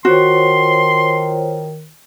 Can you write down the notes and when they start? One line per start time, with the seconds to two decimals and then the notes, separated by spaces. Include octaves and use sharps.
0.05 D#3 F4 F#4 C5 C#5 C6